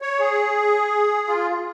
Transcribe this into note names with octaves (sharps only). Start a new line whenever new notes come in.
C#5
G#4
F4